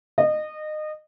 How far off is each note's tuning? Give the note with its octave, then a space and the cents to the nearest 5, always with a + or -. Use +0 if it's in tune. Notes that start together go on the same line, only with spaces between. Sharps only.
D#5 -25